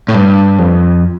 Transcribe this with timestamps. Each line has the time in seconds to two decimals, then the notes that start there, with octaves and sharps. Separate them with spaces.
0.08 A2
0.15 G2
0.59 F2